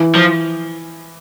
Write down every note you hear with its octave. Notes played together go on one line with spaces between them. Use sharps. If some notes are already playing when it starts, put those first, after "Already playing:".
Already playing: E3
F3